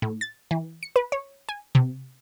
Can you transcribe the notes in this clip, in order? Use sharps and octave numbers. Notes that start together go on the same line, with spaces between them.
A2
A6
E3
C#7
B4
C#5
G#5
C3